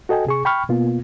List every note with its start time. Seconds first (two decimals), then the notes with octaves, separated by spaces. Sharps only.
0.09 F#4 A4 D#5 G5 G#5
0.27 C3 G#4 C#6
0.45 G5 B5 C#6 F6
0.69 B2 A#3 B3 F4